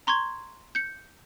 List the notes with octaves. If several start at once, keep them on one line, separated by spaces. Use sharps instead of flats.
A#5 C6 C#6 G#6
G6 C#7